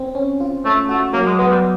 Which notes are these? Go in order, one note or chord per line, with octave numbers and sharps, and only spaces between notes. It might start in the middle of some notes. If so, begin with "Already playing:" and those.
Already playing: C4
C#4
F4
A3 C#4
A3 F#4
F#3 A#3
G#3
G#3 B3
G3